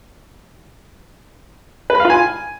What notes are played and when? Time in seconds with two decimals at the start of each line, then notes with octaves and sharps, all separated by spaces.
1.90 B4
1.95 B5
2.00 F5
2.05 F4
2.10 G#5